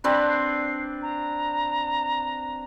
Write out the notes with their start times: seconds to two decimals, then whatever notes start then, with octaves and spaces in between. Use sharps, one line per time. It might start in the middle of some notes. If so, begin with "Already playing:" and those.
0.04 C4 D4 B4 B5
0.29 C7
1.02 A#5